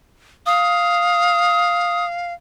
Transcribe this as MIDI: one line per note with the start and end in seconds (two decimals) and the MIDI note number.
0.46 2.33 77
0.46 2.05 87